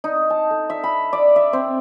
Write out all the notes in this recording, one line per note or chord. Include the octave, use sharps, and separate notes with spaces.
D#4
A5
A4
E5
B5
D5
E5
C4